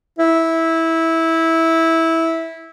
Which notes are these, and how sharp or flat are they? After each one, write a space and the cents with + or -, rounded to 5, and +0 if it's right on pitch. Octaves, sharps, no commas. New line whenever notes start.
E4 -15